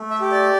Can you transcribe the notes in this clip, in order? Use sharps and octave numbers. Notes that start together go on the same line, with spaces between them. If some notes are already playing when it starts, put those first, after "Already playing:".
Already playing: A3
E5
G4
D5